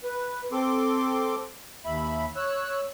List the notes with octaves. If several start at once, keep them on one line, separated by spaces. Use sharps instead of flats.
B4
C4 A4 C6 D6
D#2 E5 B5
C#5 E6 F#6